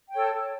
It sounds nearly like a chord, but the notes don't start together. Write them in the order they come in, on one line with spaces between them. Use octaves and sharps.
G5 C#5 A4